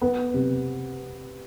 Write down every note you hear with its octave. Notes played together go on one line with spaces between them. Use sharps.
B3
C3